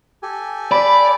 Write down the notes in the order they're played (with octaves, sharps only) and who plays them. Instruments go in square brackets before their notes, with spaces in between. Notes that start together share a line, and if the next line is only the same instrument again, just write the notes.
[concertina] G4 A4 G#5
[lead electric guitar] D5 [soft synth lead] B5